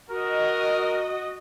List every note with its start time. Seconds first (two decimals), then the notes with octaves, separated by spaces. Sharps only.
0.10 F#4 A#4 D#5